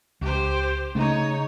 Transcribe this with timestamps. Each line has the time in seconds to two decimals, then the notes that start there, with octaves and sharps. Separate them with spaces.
0.21 C#2 G4 C5
0.95 C#3 A3 C#4 D#4 C#5